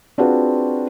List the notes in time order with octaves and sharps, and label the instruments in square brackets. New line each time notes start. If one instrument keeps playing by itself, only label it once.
[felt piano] C4 D4 F4 F#4 G#4 B4